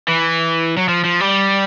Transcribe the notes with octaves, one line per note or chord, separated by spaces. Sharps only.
E3
F#3
F3
F3
G3